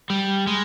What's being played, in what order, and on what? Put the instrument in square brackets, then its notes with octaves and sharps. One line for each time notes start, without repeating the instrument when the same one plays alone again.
[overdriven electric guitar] G3
G#3